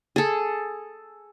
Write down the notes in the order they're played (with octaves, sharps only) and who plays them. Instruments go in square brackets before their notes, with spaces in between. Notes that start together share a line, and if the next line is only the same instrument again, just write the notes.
[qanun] G#4 A4